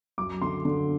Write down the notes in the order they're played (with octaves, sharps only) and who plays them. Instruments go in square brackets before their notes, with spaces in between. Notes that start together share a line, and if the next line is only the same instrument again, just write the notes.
[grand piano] F#2 D6
D3 C6
D3